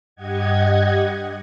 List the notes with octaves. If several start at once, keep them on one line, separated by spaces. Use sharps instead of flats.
G2 G4 D#5 F#5 G#6